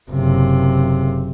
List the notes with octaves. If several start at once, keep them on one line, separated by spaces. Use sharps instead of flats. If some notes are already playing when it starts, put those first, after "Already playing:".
F#1 C3